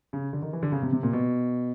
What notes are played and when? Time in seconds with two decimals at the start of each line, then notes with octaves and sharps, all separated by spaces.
0.13 C#3
0.33 D3
0.42 D#3
0.53 E3
0.63 D3
0.72 C#3
0.82 C3
0.92 C3
1.03 A#2
1.13 B2